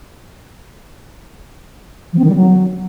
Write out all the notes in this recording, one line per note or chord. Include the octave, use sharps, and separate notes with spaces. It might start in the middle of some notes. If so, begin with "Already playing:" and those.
F3
C4
D#3
G3
F#3